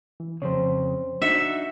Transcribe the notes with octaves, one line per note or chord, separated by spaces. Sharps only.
E3
F2 A2 C#3 C5 C#5
D4 D#4 F#4 E5